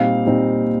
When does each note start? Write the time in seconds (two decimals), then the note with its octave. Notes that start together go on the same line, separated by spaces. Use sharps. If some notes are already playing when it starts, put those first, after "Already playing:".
Already playing: A#2 G3 C4 D#4 F5
0.26 A#2 G3 C4 D#4